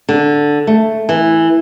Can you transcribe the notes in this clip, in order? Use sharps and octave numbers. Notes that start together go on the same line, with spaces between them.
D3
A3
E3